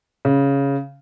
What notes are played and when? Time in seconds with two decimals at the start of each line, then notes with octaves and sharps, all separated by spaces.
0.25 C#3